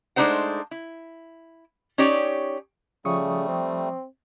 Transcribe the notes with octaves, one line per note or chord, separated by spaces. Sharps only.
G#3 A3 D4 D#4 C5 F#5
E4
C#4 D#4 G4 C#5 D5
C#3 F3 G3 A3 C#6 D#6
C4